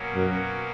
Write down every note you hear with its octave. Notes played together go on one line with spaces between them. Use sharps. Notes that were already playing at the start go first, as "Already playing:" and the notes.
Already playing: B2 F#3 A#3 C#4
F#2